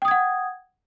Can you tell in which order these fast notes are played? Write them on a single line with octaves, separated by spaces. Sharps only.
G5 D#6 G#6 F#5